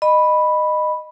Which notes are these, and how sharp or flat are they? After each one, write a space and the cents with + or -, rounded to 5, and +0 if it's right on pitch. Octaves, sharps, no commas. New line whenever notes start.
D#5 -20 B5 +0